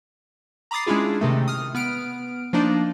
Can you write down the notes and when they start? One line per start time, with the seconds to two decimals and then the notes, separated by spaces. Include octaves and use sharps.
0.71 A#5 B5 D6 D#6 A6 C7
0.87 G#3 C#4 D4 E4 F4 G#4
1.21 C3 D#3 A3
1.48 D#6 F6
1.75 B3 F6 D7
2.53 F3 A#3 D4 D#4